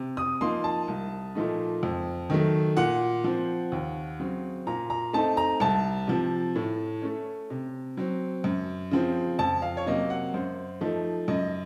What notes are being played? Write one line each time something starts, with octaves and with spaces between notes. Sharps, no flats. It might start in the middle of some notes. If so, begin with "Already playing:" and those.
Already playing: C3
D#6
F3 A#3 D#4 C6
A5
C2
A#2 F3 A3 D#4
F2
D#3 F#3 A3
A#2 F#5
F3 C4
D#2
C#3 F#3 C4
A#2 A#5
A#5
A3 C4 D#4 A5
A#5
C2 A5
C3 F3
A2
A3 C#4
C3
F#3 C4
F#2
C#3 F3 C4
F2 A5
F5
C#5
C3 F#3 A#3 C#4 D#5
F#5
F#2 C5
F3 A3 D#4
F#2 D#5